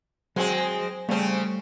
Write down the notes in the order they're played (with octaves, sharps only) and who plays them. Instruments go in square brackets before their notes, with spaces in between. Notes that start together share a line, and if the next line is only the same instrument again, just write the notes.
[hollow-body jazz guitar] F#3 C5 F#5 [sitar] G#3 C4
[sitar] C#3 C4 [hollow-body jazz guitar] G3 A3